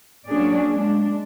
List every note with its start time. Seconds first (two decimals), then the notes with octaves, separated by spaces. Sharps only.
0.28 F#3 A#3 C#4 D4 G#4 D5
0.73 G#3 D4